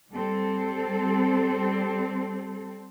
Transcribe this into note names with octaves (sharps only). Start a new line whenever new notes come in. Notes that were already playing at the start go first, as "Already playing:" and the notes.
G3 C4 A4